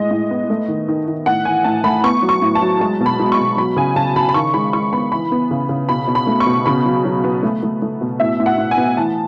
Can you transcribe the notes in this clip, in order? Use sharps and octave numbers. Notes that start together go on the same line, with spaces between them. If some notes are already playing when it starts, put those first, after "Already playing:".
Already playing: A2 G#3 D#5
A2
B3
A3
D#3
D#3
D#3
A2 F#5
E3 G#5
A2 A5
A3 B5
B3 C#6
F#3
C#6
A2
A5
F#3
G#3 A5
B2
B5
G#3
C#6
B2
F#3 B5
C#3 G#5
C#3 A5
C#3 B5
B5
D#3 C#6
G#3 B5
G#3 C#6
B3 B5
E3 B5
B3
C#3
C#3
B2 B5
B2
B5
A3
C#6
B2
C#3 B5
F#3
F#3
B3
A3
A3
A3
B2
A2 E5
A2
F#5
A2
G#5
B3
E3 A5